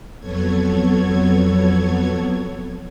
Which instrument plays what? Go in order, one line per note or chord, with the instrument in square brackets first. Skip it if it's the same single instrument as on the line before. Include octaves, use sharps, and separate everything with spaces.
[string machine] F2 F#3 B3 A4 C#5 G#6